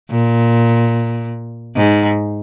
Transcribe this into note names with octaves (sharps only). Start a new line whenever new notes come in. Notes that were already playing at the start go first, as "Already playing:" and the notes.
A#2
G#2